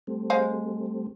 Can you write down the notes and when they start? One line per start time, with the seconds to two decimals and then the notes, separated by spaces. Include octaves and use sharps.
0.07 G3 A3 C4
0.30 G#3 C5 F5